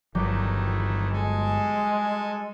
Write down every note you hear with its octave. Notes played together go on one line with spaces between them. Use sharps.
G1 D#3 E3 F#3 G3 A3 G4
G#3 A4 G#5